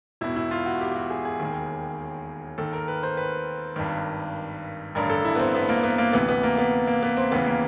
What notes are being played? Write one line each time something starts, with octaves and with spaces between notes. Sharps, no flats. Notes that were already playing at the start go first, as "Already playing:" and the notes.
E1 E2 B2 E4
E4
F4
F#4
G4
G4
F#4
G#4
G#4
E1 D#2 D#3
D#2 D#3 A4
A#4
B4
C5
B4
G#1 G2 D#3
A1 G2 D3 A#4
A4
E4
B3
C4
B3
A#3
B3
A#3
D2 C3 E3 B3
B3
A#3
B3
A#3
B3
C4
D#2 C#3 E3 B3
A#3